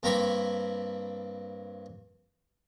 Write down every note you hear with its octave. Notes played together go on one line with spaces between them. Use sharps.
G2 A#3 C4 A#5 B5 C#6